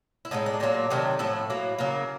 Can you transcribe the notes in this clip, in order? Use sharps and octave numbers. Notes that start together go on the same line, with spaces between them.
E4
A2 F3 G#3 D#4
D4
A#2 F#3 A#3 D4
C3 D#3 F#3 A3
A2 F3 A3 E4
A2 F#3 A#3
C#3 F#3 A#3 A#4